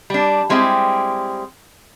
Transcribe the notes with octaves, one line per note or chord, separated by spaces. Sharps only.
G3 D4
G3 G#3 C4 E4 G4